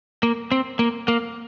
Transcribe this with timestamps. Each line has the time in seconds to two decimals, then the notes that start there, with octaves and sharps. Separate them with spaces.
0.23 A#3
0.52 C4
0.79 A#3
1.08 A#3